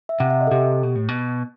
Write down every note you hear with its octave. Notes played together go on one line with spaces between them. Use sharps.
E5
C3 F#5
E5
D#5
A4
C3 G4
B2
A2
B2